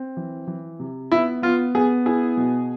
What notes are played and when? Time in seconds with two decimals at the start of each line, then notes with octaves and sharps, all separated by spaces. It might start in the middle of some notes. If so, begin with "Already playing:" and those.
Already playing: C4
0.17 E3
0.47 E3
0.79 C3
1.12 B3 E4
1.42 B3 F4
1.75 B3 G#4
2.06 E4 G#4
2.37 B2